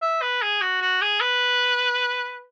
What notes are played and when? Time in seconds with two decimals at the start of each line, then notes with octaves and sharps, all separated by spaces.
0.02 E5
0.22 B4
0.42 G#4
0.62 F#4
0.82 F#4
1.02 G#4
1.21 B4